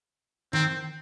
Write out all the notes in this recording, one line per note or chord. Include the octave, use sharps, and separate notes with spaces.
D#3 C4